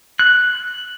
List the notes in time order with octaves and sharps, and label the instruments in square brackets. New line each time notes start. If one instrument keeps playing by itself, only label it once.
[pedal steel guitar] F#6